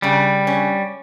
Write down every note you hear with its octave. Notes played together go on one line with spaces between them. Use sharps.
C#3 G3
C#4